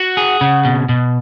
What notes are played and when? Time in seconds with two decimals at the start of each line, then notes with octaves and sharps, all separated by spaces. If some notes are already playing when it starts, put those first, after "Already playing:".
Already playing: F#4 F#5
0.17 G#4
0.41 C#3
0.65 B2
0.89 B2